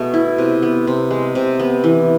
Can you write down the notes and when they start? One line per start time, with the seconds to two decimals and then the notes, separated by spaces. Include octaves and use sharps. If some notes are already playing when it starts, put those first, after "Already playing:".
Already playing: B2 A3 G#4
0.14 E4
0.38 C3
0.62 B3
0.87 C3
1.10 G#3
1.35 C3
1.59 B3
1.84 E3